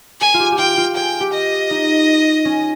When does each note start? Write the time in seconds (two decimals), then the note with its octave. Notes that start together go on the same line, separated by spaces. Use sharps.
0.21 G#4 G#5
0.34 F4
0.40 G4
0.52 G4
0.58 F4 G5
0.77 F4
0.96 G#4 G5
1.20 G4
1.34 D#5
1.70 D#4
2.45 C#4